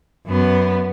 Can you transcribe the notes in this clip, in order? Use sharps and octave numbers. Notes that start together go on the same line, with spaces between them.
F#2 B3